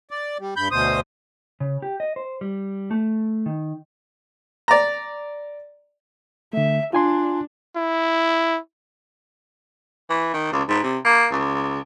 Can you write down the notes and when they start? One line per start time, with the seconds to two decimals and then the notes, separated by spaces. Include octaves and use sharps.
0.11 D5
0.39 G3
0.57 G2 B5 G6
0.71 D2 B2 C5 D#6
1.60 C#3
1.82 G4
2.00 D#5
2.16 C5
2.41 G3
2.91 A3
3.46 D#3
4.68 D5 A#5
6.53 D3 A3 E5
6.93 D4 F4 G#5 C6
7.76 E4
10.10 E3
10.34 D#3
10.52 C#2
10.68 G#2
10.83 C3
11.05 A#3
11.32 C#2